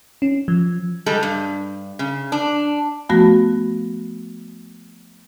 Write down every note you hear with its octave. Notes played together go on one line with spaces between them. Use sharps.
C#4
F3
G3 G#3 A4
G2
C#3
D4
F3 A3 B3 F#4 A#6